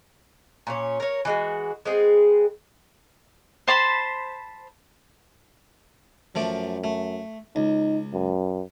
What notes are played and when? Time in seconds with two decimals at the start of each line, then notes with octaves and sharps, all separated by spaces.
0.67 A#2 C#4 C#5
1.00 A#4 C#5
1.25 E3 G#3 F#4
1.85 G#3 B3 C4 G#4
3.68 C5 A5 B5 C6
6.35 F#2 F3 A3 D5
6.84 A3
7.56 C#2 D#4
8.13 F#2